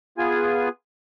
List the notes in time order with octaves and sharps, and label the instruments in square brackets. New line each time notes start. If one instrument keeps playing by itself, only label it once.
[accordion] B3 F4 G#4 G#5